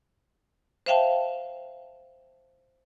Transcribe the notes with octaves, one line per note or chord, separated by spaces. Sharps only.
C5 E5 F5 G5 A5